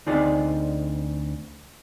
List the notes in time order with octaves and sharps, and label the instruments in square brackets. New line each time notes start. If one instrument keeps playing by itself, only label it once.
[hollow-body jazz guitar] D2 C4 D#4 G#4 D5